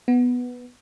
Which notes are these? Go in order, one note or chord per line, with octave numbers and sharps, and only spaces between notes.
B3